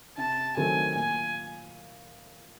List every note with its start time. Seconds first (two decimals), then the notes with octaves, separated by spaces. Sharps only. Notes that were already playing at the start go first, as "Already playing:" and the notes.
0.17 C3 A5
0.57 D#3 F#3 A3 C4 G#5
0.95 A#2 G#5